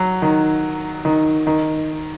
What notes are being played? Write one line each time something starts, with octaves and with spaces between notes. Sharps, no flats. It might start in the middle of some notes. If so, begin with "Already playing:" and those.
Already playing: F#3
D#3
D#3
D#3